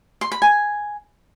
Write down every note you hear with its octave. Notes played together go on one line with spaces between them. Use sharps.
C6
B5
G#5